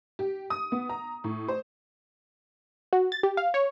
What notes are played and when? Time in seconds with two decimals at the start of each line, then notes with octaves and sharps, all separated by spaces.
0.19 G4
0.50 D#6
0.72 B3
0.89 A#5
1.24 A2
1.48 C5
2.93 F#4
3.12 A6
3.23 G4
3.37 F5
3.54 C#5